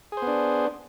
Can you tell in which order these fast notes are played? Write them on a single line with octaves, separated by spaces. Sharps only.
G#4 C5 B3 D4